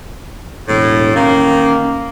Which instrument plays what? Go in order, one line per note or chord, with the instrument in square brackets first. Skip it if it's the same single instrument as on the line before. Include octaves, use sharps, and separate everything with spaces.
[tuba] E1 [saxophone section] A2
[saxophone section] D#3 A#3 [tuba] C#4